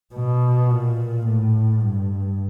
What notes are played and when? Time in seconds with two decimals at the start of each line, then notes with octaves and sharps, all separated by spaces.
0.14 B2
0.70 A#2
1.26 A2
1.83 G2